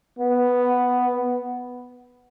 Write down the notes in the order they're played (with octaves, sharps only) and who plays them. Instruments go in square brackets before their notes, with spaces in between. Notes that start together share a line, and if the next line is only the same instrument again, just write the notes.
[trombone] B3